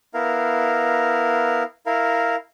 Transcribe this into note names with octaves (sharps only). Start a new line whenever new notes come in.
B3 E4 A#4 F5
E4 A#4 F5